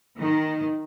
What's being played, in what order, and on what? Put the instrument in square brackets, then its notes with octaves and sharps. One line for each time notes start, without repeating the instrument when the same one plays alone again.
[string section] D#3